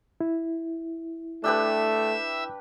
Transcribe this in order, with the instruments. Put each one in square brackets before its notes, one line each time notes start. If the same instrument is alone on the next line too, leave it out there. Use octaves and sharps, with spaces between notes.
[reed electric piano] E4
[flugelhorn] A3 [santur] D4 G4 B4 [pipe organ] E5 E6